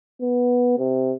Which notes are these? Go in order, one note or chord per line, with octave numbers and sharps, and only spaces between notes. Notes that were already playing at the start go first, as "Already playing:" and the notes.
B3
C3